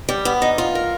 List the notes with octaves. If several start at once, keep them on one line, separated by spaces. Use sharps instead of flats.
G3
B3
D#4
F4
A#4